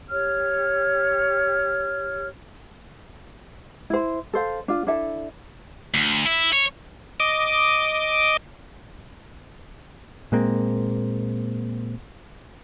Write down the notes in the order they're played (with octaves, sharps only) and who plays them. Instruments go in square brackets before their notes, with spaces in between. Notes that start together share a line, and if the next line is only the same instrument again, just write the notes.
[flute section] G4 C#5 F6
[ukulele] E4 C5
A4 C5 F5
D4 F4
D4 E4 A4 E5
[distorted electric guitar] D2
E4
C#5
[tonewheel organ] D#5 D6
[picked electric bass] A#2 G#3 A#3 C4